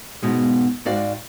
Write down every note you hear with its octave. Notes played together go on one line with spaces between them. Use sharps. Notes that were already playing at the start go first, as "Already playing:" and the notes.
G#2 B2 G#3
G#2 F#4 D5 F5 G5